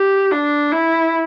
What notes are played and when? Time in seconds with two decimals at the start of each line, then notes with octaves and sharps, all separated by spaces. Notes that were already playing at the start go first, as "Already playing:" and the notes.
Already playing: G4
0.31 D4
0.72 E4